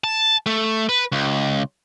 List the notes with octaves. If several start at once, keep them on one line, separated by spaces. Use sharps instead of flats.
A5
A3
B4
C#2